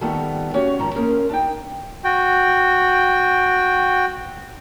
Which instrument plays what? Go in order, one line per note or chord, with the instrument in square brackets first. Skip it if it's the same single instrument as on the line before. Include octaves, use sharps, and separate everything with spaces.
[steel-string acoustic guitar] D#3 G3 A3 B3 F4 A4
A3 C#4 F#4 G4 C#5 F5
G#2 D#3 F3 A#5
A3 A#3 C#4 F4 G#4 A#4
D4 D#4 G5
[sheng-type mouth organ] F#4 G5